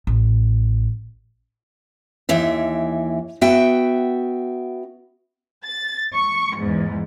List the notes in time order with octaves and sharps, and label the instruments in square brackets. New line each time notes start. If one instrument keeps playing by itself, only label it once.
[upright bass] A1
[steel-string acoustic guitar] D#2 E3 E5
B3 F#4 E5 G5
[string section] A6
C#6
E2 G#2